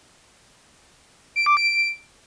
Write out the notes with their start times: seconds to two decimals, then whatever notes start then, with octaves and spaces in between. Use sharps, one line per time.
1.36 D7
1.46 D6
1.57 D7